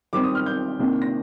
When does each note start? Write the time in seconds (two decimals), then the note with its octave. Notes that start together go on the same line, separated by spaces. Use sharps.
0.13 D#3 G3 C4 D6
0.24 D#6
0.35 F6
0.46 G6
0.79 C3 D#3 A#3 D4
1.02 A#6